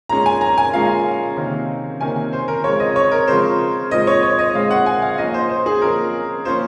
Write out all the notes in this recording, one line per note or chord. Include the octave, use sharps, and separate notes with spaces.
A#2 G#3 C#4 A#5
G#5
A#5
G#5
A#2 G#3 C#4 F5
C3 D#3 A#3 C#4
C3 D#3 A#3 C#4 G#5
C5
A#4
C#3 F3 G#3 C4 C#5
D#5
C#5
A#4
C#3 F3 G#3 C4 C5
A#2 G#3 C4 D#5
C#5
C#5
D#5
A#2 G#3 C4 F5
F#5
G#5
F5
F3 A#3 C#4 D#5
C5
C5
G#4
F3 A#3 C#4 A#4
F3 A#3 C#4 C5